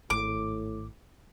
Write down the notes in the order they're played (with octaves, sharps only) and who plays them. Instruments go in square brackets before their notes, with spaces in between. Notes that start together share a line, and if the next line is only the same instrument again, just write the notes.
[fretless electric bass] G#1 [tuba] A2 [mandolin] D6